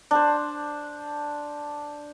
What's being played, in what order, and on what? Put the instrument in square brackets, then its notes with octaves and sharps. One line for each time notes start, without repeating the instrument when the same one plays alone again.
[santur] D4 C5